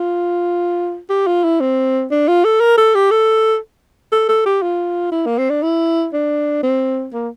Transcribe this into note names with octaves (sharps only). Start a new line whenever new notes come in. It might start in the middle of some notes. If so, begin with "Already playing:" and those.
Already playing: F4
G4
F4
E4
C4
D4
F4
A4
A#4
A4
G4
A4
A4
A4
G4
F4
E4
A#3
C4
D4
E4
D4
C4
A#3